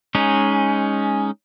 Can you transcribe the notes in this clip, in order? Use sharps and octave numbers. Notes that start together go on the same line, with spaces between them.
G#3 C#4 D#4